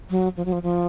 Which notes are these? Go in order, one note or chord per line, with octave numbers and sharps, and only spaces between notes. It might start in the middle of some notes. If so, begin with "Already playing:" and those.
F#3
F3
F#3
F3
F3